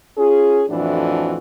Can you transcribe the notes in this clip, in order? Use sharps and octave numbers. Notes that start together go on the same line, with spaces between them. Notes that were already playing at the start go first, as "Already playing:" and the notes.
C#4 F4 G#4
F2 A2 E3 D4 F#4